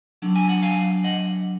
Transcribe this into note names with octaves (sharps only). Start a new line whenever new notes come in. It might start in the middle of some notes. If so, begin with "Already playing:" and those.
D3 F#3 D4
G#5
F#5
F5 G#5
D#5 F#5